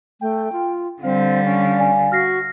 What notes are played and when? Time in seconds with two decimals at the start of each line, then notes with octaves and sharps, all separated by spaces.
0.21 A3 G5
0.52 F4
1.02 D3 G3 C4 F5
1.44 C#4
1.77 D5 G#5
2.12 F#4 F6 A#6 C7